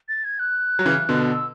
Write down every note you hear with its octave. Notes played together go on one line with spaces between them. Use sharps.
A6
G#6
F#6
F#3
C#3 E3
B2 D3
E6